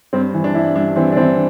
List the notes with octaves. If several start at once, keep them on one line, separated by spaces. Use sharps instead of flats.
G2 C4
E3
D4
G2 E4
G2 D4
E3 C4
D4
E3 C4